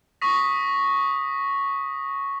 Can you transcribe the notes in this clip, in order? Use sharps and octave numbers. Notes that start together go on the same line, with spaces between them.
C#6 D#6 A#6 B6